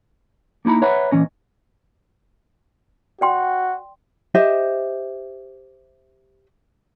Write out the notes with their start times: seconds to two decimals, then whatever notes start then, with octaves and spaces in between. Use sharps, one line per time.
0.65 A#3 D#4 E4 A#5 B5
0.82 B4 C#5 E5 F#5 A#5 B5
1.11 A#2 E3 C#4 D#5
3.21 F#4 D5 G5 C6
4.34 G4 C5 D#5 E5